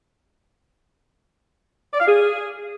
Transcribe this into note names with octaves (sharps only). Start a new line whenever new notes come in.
D5
F5
G#4